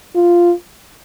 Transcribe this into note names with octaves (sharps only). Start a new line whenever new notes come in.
F4